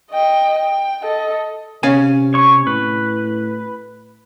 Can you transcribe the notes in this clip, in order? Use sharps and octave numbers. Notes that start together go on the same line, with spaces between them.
D#5 G5
G5
A4 D#5
C3 C#4 F5 G#5
C#5 C#6
A2 B4